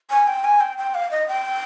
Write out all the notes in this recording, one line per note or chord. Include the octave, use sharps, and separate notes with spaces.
G#5
G5
G#5
G5
G5
F5
D#5
G5